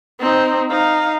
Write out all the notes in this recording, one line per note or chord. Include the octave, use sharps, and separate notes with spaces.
C4 D#4
D#4 F5